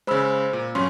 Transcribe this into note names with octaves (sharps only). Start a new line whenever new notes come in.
C#3 G#3 C5 B5 E6
A#2
G2 F#3 C#4 C6